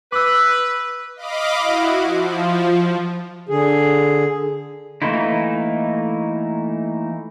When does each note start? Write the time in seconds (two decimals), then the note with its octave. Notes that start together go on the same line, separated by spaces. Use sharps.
0.12 B4 D6 E6
1.16 D#5 F5 B5 D6
1.58 E4 F#4
2.03 F3
3.49 D3 G#4
5.02 E3 A3 A#3 D#4 E4